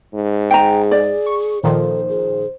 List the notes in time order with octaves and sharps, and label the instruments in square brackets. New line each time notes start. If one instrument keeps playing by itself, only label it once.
[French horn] G#2
[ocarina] G#4 [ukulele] G5 A#5
[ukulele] D5
[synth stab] C#6
[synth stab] A#2 D#3 F3 [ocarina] A4 [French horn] C5
[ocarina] G#4